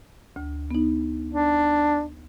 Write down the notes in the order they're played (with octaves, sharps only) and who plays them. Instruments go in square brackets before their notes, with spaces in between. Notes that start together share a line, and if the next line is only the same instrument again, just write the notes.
[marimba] D2
B3 D#4
[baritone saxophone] D4